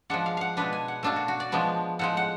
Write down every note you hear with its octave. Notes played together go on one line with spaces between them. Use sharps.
F3 G#3 D4 F#5
F5
F5 F#5
B2 G#3 D4 B4
G#5
F#5
B2 A3 D4 F5
F#4
F#4
D5
F3 G#3 B3 D4
A2 F3 G#3 F#5
F#5